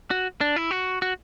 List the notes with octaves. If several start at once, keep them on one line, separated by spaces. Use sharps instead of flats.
F#4
D4
E4
F#4
F#4